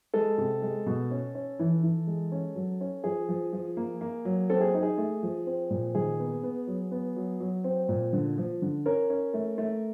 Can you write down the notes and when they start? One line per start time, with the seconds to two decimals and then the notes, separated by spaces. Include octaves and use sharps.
0.14 G#3 A4
0.38 C3
0.62 G#3
0.86 B2
1.11 C#4
1.35 C#4
1.59 E3
1.83 E3
2.07 G#3
2.32 C#4
2.56 F#3
2.81 C#4
3.04 F3 G#4
3.29 F3
3.53 F3
3.77 A#3
4.01 A#3
4.25 F#3
4.50 C4 A4
4.61 G#4
4.74 D#4
4.83 G#4
4.98 A3
5.23 F3
5.46 C4
5.70 A#2
5.95 D#3 G#4
6.19 B3
6.43 B3
6.67 F#3
6.91 B3
7.16 F#3
7.40 F#3
7.64 C4
7.89 A#2
8.13 D3
8.38 F3
8.62 D3
8.86 C#4 A#4
9.10 C#4
9.34 A3
9.58 A3